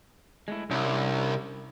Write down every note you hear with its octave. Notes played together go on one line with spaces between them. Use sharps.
G#3 A3 E4
C2 C#4 D4 E4